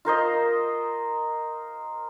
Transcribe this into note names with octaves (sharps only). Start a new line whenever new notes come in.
F4 A#4 C5 D#5